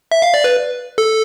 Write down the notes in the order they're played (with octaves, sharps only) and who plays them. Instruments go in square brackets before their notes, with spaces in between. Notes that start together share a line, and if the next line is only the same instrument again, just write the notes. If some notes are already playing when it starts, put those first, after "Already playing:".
[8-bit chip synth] E5
F5
D5
B4
A4